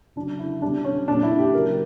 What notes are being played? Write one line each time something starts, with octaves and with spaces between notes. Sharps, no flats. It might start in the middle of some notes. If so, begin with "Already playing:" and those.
C#3 F#3 D4
E4
B2 G3 D4
C#4
A#2 F#3 D4
E4
G4
C#3 F#3 A#4